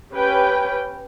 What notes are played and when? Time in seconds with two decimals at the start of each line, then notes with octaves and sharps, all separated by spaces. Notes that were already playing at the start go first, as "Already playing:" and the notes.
0.12 C#4 G4 B4 G5